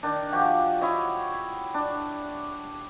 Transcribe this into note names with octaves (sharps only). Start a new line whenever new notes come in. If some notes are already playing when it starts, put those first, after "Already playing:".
D#3 D4
F3 F#4 G4
E4 C#5 D#5
D4